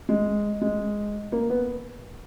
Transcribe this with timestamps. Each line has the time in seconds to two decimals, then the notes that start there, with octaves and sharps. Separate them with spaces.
0.09 G#3
0.61 G#3
1.32 A#3
1.50 B3